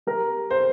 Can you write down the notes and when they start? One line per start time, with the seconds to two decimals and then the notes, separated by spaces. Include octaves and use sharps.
0.07 G3 A#4
0.51 C5